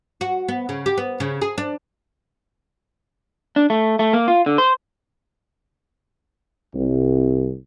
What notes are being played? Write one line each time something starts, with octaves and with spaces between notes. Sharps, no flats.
F#4
B3
C#3
G4
B3
C#3
G#4
D4
D4
A3
A3
A#3
F4
D3
C5
C2